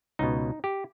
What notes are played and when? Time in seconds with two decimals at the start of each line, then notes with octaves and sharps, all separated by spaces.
0.19 C#2 B2 D#4
0.64 G4